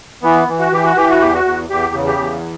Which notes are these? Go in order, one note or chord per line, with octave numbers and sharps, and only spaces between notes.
E3 B3
E3
F#4
E3 G4
F#4
E3 G4
F#4
E2 G4
F#4
E2
E2 G4
C#3
G4
E2